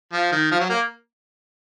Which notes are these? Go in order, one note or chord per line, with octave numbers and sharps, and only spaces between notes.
F3
D#3
F3
F#3
A#3